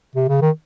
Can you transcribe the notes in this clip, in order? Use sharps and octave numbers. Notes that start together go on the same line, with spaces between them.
C3
C#3
D#3